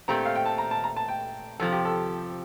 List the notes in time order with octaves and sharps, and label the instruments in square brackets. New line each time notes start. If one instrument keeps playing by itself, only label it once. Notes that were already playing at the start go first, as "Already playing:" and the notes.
[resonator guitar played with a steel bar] A#2 A3 C4 G4 [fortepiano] A#5
[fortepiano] F5
G5
A5
A#5
A5
A#5
A5
G5
[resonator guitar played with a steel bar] F2 C3 F3 [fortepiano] A4
[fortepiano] G4
A4